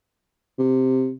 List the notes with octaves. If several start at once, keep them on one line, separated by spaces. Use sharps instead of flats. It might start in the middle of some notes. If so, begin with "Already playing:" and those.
C3